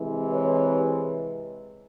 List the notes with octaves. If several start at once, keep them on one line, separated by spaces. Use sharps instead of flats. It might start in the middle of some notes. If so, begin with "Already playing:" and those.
Already playing: C3 E3 G#3
B4 C#5